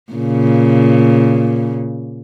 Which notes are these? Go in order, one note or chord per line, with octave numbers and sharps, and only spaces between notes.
A#2 C#3